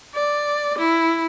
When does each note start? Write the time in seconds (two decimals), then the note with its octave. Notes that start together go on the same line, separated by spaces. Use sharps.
0.14 D5
0.78 E4